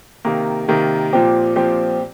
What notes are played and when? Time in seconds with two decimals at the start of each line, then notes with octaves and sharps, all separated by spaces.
0.25 C3 D#3 A#3
0.68 C3 D#3 A#3
1.13 A#2 F3 C4 G4
1.56 A#2 F3 C4 G4